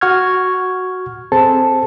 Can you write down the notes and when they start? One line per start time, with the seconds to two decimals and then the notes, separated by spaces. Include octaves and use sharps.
0.01 F#4 F#5 C#6 F6 G#6
1.32 C4 G#4 A4 C5 A5